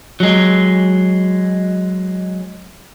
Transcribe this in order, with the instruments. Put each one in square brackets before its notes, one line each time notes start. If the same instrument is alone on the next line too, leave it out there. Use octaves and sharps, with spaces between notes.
[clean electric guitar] F#3 G#3